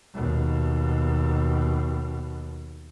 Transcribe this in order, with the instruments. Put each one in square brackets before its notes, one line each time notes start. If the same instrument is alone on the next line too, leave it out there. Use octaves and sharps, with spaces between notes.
[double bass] D#2 B2